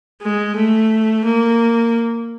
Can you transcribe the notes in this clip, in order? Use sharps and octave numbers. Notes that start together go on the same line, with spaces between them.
G#3
A3
A#3